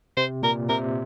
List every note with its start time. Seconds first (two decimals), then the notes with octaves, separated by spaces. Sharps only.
0.17 C3 C5
0.43 A#2 A#4
0.69 C3 A#4